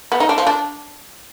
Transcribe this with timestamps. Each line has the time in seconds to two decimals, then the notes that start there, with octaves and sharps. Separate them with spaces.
0.12 B3
0.20 D#4
0.29 D4
0.38 F3
0.47 D4